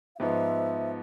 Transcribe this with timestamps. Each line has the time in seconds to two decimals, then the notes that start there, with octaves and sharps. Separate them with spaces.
0.16 F5
0.20 G#2 F3 B3 E5